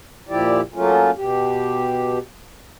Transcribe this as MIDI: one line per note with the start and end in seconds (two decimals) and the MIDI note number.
0.29 0.61 46
0.29 0.61 53
0.29 0.61 64
0.29 0.61 67
0.29 0.61 74
0.74 1.11 54
0.74 1.11 57
0.74 1.11 58
0.74 1.11 61
0.74 1.11 65
1.16 2.19 47
1.16 2.19 67